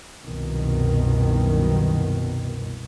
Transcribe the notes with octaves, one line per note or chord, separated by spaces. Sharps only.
C2 F#2 B2 D#3